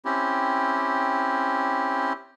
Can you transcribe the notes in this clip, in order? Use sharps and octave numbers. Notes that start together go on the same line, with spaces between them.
C4 C#4 E4 G4